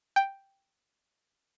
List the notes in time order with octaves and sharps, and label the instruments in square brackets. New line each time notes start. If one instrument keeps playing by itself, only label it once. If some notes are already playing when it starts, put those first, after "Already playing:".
[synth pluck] G5